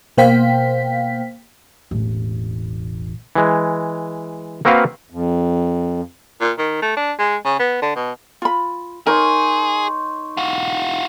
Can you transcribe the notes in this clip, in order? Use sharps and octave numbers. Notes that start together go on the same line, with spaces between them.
B2 A#3 C5 F5 G5 B6
E1 A1
E3 G#3
A#3 C4 F#4 A#4 B4 F5
F2
A#2
D#3
A3
D4
G#3
C#3
B3
D3
B2
F4 B5
D#4 G#4 A#4 C#5 C6
F4 F#4